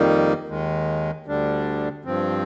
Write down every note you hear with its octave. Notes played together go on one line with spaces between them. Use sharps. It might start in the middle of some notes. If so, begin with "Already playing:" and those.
Already playing: F2 D#3 G3 A#3 D#4
D#2 D#3 G#3
D2 D3 G3 D4
G2 F3 C4